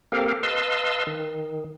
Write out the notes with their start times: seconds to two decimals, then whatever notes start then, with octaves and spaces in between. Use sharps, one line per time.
0.12 A#3 C4 G4 A4 A#4 F5
0.43 B4 D#5 F5 A5 C6 E6
1.07 D#3